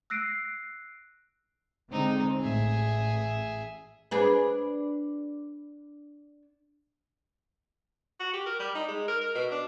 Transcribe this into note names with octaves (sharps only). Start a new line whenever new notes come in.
E6 F#6 A#6 C7 D7 D#7
D3 G#3 C4 D#4
A1 G#4 E5
D4 G#4 B4
F#4
G4
A#4
G3
D#4
G#3
A#4
A#4
B2
D4